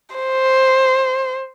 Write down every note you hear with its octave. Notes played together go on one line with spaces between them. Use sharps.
C5